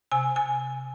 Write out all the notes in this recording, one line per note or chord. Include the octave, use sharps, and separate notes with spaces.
C3 G#5
G#5